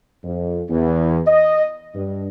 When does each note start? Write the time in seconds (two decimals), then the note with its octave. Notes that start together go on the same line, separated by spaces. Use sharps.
0.24 F2
0.69 E2
1.27 D#5
1.95 G2